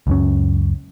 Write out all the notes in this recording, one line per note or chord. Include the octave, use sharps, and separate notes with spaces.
C#2 F#2 C#4